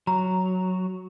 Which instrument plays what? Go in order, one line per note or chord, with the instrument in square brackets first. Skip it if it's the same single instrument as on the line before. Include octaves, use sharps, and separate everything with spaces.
[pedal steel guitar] F#3 [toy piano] A#5